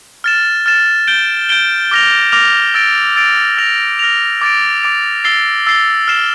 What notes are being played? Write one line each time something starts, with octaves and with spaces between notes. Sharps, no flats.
F6 A6 E7
F6 A6 E7
G6 D7 G7
G6 D7 G7
D6 F6 A#6 F7
D6 F6 A#6 F7
E6 A6 D7
E6 A6 D7
F6 A#6 F7
F6 A#6 F7
D6 A6 D7
D6 A6 D7
E6 A6 C7 G7
E6 A6 C7 G7
F6 C7 E7